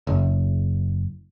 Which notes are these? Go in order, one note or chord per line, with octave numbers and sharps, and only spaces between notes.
F#1